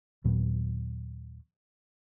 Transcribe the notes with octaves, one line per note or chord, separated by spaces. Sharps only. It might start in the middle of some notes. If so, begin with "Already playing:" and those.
D#2 A#2 F#3 B3